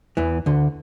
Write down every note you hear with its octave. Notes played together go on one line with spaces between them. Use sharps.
E2 E3
D2 D3